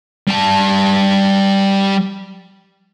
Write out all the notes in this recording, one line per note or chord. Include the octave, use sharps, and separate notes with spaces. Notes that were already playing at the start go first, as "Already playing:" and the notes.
G3 A5